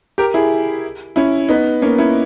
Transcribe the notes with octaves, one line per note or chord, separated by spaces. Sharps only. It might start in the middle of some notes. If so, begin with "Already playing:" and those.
G4 A#4
E4 G#4
C#4 E4
B3 D#4
A#3 C#4
C#4 E4